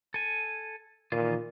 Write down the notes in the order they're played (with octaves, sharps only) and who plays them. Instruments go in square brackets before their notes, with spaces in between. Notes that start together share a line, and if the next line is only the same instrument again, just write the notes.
[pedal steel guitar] A4 G#5
[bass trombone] A#2 [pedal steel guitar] D#3 E3 F4